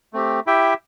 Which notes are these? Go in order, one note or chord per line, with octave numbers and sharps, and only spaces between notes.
A3 C4 G4
E4 G4 E5 G5